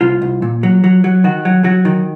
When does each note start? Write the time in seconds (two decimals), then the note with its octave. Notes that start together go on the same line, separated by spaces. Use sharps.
0.01 C2 F4
0.22 C2
0.42 A#2
0.63 F#3
0.84 F#3
1.04 F#3
1.24 D#3 F#4
1.45 F#3
1.64 F#3 F#4
1.85 D#3